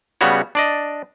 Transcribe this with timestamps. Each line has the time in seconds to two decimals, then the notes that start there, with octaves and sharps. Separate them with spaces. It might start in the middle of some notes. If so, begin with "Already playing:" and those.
0.21 C#3 G3 B3 F#4 C#5
0.55 D4 D5 D#5